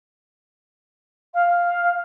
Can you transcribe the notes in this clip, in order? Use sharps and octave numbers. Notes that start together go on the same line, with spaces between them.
F5